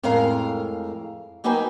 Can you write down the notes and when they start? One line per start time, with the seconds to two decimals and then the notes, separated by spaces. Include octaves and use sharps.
0.03 F2 A2 G#3 A#4 F5
1.44 F#3 A#3 D#4 B4 G5 G#5